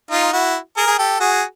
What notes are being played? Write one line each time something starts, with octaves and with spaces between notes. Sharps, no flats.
D#4 F4
E4 F#4
G#4 A#4
G#4
G4 A4
F#4 G#4